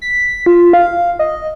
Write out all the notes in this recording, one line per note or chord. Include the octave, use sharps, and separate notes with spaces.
B6
F4
F5
D#5